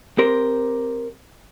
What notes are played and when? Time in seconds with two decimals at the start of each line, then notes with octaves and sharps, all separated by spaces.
0.18 C4 G4 A#4 C5